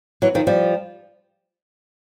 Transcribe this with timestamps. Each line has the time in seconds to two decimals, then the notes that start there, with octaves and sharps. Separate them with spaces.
0.22 E3 F#3
0.35 D#3 F3
0.47 F3 G3